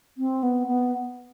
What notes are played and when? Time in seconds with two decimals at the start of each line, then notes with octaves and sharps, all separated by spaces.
0.18 C4
0.43 B3
0.67 B3